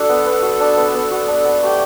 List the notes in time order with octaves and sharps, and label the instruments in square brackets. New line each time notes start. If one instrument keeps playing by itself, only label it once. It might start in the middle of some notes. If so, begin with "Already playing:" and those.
Already playing: [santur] D4 F#4 [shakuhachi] A4
[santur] B3
B3
F#4
D4
B3
B3
F#4
D4
B3
[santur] A3 [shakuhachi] G4